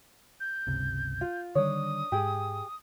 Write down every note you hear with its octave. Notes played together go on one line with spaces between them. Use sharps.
G6
G1 C#2 C3
F4
D3 D#3 G3 D4 C#5 D#6
G#2 G4 G#4